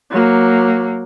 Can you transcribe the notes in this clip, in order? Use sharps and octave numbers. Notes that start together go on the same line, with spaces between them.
F#3 A#3